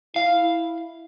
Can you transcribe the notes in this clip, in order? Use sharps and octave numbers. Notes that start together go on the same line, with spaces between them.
E4 F5